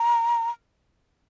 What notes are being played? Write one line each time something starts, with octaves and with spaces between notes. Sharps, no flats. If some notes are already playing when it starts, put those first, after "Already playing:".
Already playing: A#5